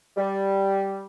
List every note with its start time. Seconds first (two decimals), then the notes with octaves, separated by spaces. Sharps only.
0.17 G3